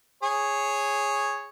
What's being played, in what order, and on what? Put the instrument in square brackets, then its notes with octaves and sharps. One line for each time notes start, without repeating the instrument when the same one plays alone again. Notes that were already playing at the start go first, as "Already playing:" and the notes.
[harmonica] G#4 C#5